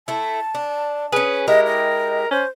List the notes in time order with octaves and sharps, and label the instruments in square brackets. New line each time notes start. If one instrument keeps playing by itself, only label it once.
[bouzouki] A3 E4 [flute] A5
[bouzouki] D4
[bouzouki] C#4 G#4 [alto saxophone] B4
[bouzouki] G#3 E4 G4 [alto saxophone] A#4 [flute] D#5
[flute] D#5
[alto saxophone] C#4 [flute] C5